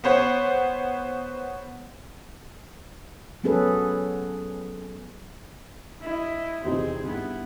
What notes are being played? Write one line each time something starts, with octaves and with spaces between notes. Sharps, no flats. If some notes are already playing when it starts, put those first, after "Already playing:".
B3 C5 C#5 F#5
F#3 B3 C#4 G#4 A4 B4
E4 D#5
E2 C3 C4 D#4 G#4
G2 B3 E4